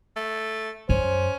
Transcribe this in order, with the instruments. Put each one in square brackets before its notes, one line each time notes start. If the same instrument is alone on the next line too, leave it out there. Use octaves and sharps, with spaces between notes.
[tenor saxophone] A3
[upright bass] F#2 [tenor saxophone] C#4 [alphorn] C5